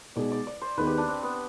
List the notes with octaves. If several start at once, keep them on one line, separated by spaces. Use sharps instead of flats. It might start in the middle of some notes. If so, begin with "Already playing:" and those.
B2 G#3 B3 D#4 G#4 D5
D5
D5
C5
D#2 D#3 B3 D#4 G#4 B4
G4
D4
C4
B3